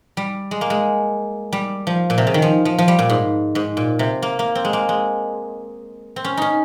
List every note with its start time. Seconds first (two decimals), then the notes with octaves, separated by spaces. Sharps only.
0.17 G3
0.51 G#3
0.61 A#3
0.70 G#3
1.53 G3
1.87 F3
2.10 A#2
2.18 C3
2.27 C#3
2.34 D#3
2.42 F3
2.65 F3
2.78 F3
2.88 G3
2.99 A#2
3.09 G#2
3.55 G#2
3.77 A#2
3.99 C3
4.22 A#3
4.39 A#3
4.55 C4
4.65 G#3
4.73 A#3
4.89 G#3
6.16 C4
6.24 C#4
6.37 C#4 D#4